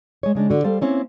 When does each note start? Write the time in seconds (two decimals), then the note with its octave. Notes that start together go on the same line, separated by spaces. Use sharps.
0.23 G#3 C#5
0.35 C#3 G#3 D4
0.50 D3 F#4
0.64 G3 A4 C5 F5
0.81 A#3 C4 C#4 E4